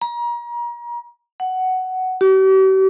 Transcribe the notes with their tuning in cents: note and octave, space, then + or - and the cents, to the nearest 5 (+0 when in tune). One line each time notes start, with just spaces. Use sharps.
A#5 +35
F#5 +10
G4 -45